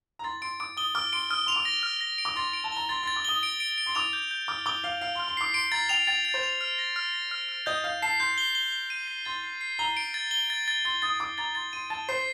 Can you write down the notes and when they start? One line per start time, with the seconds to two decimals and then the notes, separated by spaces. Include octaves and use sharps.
0.19 A#5
0.24 C6 A6
0.42 C6 D7
0.60 D6 D7
0.77 D#6 G7
0.95 D6 F6
1.13 C6 D7
1.30 D#6 F6
1.46 C6 F7
1.56 D6
1.65 A#6
1.83 F6
2.01 A#6
2.18 D7
2.25 D6
2.36 C6 A6
2.53 D7
2.64 A5
2.72 A#5 G7
2.89 C6 A6
3.03 C6 A6
3.16 D6
3.25 D#6 G7
3.43 D7
3.60 D7
3.78 D7
3.86 C6
3.95 D6 F7
4.13 G6
4.31 G6
4.48 D6 F6
4.66 D6 G7
4.83 F5 G7
5.01 F5 F6
5.15 C6
5.20 F6
5.28 C6
5.37 D6 C7
5.54 C6 D7
5.72 A#5 A6
5.89 G5 F7
6.07 G5 A6
6.25 A6
6.34 C5
6.43 F7
6.61 F6
6.79 A#6
6.96 F6
7.13 A#6
7.31 F6
7.49 F6
7.66 D#5 G6
7.84 F5 G6
8.02 A5 C7
8.20 C6 G6
8.38 G7
8.55 G7
8.72 G7
8.90 D#7
9.08 C7
9.25 C6 A6
9.44 C7
9.61 C7
9.79 A#5 G7
9.97 D7
10.14 A6
10.31 G7
10.50 A6
10.68 A6
10.85 C6 A6
11.02 D#6 A6
11.20 D6 A6
11.38 A#5 A6
11.55 C6 A6
11.73 C6 D#7
11.90 A5 A6
12.09 C5 C7